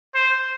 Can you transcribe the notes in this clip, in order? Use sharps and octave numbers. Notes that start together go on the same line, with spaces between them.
C5